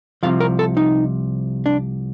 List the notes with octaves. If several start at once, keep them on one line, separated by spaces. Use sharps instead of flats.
C2 C3 F3 F5
A#4
A4
D#4
D4